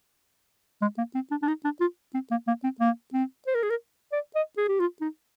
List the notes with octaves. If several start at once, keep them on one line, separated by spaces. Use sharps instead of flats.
G#3
A#3
C4
D4
D4
D#4
D4
F4
C4
A#3
A#3
C4
A#3
C4
C5
A#4
G#4
A#4
D5
D#5
G#4
G4
F4
D#4